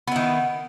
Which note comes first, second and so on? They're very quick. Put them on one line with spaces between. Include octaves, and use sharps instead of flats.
B3 E4 D#3